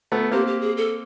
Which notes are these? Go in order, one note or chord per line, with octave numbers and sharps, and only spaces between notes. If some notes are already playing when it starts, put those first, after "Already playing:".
A3 B3
A#3 C4 G4
G4
G#4
A4